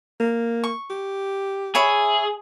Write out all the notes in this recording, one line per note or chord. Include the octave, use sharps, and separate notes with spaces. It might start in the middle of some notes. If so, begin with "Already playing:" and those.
A#3
C#6
G4
G#4 C#5 E5 B5